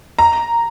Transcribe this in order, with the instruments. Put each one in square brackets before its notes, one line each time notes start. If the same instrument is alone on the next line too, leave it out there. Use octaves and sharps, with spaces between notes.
[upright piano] A#5